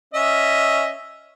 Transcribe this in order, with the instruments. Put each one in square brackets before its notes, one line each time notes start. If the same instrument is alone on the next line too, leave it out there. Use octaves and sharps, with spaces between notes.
[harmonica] C#4 D#5 E5